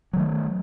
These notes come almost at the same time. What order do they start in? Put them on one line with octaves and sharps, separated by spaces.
F#3 D#3 A3